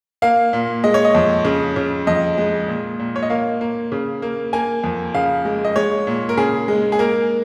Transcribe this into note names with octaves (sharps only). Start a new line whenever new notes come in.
A#3 F5
A#2
G#3 D#5
C#5
D#5
F2
C#3
C#3
F2 D#5
G#3
A#2
A#2
C#5
D#5
A#3 F5
A#3
C#3
A#3
A#3 G#5
F2
C#3 F5
G#3
D#5
G#3 C#5
A#2
A#4
C#3 G#4
G#3
G#4
A#3 A#4